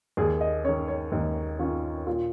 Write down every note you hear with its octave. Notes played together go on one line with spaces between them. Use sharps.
D#2 G#4
D#5
D#3 C#4 C#5
C#5
D#2 D#4
D#3 C#4 F4
A#2 F4